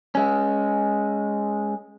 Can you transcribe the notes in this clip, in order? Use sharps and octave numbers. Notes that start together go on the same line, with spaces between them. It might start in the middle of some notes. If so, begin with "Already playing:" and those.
G#3 C#4